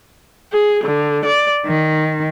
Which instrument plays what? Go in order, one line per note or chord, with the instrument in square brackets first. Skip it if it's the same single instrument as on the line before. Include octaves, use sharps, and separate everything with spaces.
[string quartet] G#4
D3
D5
D#3